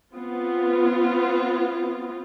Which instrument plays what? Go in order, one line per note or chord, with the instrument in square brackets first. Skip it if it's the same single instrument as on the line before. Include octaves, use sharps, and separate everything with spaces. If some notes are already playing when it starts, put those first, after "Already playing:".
[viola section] B3 C4 F4